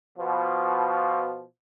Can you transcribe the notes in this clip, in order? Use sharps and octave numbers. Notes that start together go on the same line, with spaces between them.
B2 F3